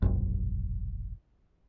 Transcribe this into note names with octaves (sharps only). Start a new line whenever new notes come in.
E1 A#1 F#2